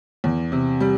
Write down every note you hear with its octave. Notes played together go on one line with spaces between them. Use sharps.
E2
C3
G3